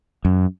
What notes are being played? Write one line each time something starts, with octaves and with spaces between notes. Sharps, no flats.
F#2